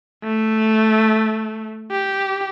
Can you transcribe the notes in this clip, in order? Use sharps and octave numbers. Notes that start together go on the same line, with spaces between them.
A3
G4